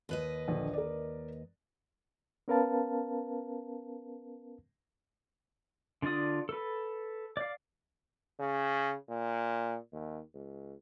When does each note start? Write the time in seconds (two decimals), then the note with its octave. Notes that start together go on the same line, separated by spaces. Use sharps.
0.09 D#2 B4 D#5
0.48 A#1 D3
0.73 A#4 D5
2.48 B3 C#4 A#4 B4 F5 A5
6.02 D3 D4 F4 D5 D#6
6.49 A4 B4
7.37 D5 F5
8.39 C#3
9.09 A#2
9.92 D#2
10.34 C#2